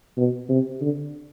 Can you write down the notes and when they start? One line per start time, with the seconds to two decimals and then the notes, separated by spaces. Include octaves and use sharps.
0.17 B2
0.49 C3
0.81 D3